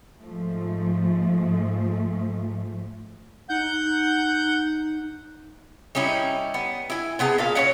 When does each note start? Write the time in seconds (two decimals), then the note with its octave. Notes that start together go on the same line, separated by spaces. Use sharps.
0.19 G#2 F3 A3
3.49 D#4 F#5 G6
5.95 G3 C#4 D#4 E4
6.54 B3
6.90 E4 G#5
7.19 C3 B3 G#4 A5
7.38 A#2 B4 F5
7.55 C#4 D4 F#4 C#5